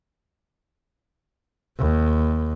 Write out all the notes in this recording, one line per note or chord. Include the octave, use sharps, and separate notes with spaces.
D#2